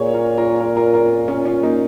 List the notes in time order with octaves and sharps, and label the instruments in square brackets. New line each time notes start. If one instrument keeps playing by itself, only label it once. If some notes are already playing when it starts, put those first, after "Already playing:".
Already playing: [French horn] A#2 [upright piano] G#4 C#5
[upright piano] F4 A#4
F4 A#4
F4 A#4
F4 A#4
F4 A#4
C#4 F4
C#4 F4
A#3 D#4